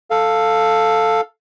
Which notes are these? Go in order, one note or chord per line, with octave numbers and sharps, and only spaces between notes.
A4 F5